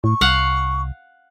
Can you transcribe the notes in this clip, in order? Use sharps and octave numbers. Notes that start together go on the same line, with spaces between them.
A2 C#6
C2 F5 F#5